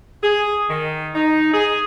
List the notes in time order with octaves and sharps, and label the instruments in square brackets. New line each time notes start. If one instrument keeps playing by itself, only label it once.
[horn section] G#4
D#3
D#4
G#4